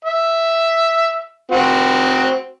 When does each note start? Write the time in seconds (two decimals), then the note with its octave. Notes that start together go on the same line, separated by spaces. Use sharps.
0.05 E5
1.52 C4 F#4